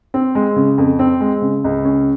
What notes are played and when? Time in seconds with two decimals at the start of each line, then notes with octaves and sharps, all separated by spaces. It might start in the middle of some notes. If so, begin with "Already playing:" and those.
0.14 C4
0.35 G#3
0.56 C#3
0.78 F2
0.99 C4
1.21 G#3
1.42 C#3
1.64 C#2
1.85 C#4